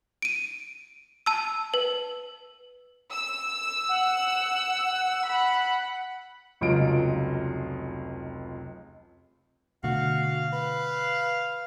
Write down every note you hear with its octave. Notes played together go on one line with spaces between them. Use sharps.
D7 D#7
A5 E6
B4
E6
F#5
F#5 B5
F1 C#2 F#3 F4 D#5 D7
B2 D3 A3 F#4 F5
B4